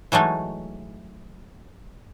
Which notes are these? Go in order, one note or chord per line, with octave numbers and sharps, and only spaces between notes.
E3 F#3 G#3 A3 D#4